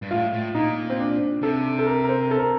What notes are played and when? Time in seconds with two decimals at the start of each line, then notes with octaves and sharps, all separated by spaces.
0.02 G2
0.11 A2 F4
0.33 A2
0.55 A#2 D#4
0.90 C4
0.99 D4
1.42 C3 A4
1.79 A4
1.86 A#4
2.04 A#4
2.09 C5
2.31 A4
2.39 A#4